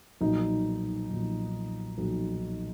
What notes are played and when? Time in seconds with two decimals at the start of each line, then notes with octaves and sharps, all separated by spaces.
0.21 B1 A#2 F3 D#4
1.10 B1 A#2 F3
1.98 B1 A#2 F3